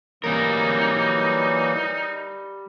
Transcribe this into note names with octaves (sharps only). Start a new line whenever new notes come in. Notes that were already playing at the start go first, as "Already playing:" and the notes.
E3 F#3 G3 A#3 D#4 A#4